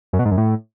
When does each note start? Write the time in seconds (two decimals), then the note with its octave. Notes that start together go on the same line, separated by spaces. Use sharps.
0.13 F#2
0.19 B2
0.25 G#2
0.31 F#2
0.37 A2